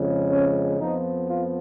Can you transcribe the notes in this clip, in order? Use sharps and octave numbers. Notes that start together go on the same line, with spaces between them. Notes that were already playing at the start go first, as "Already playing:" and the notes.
Already playing: F2 C#3 G#3
C#4
F2 F3 B3 D#4
F4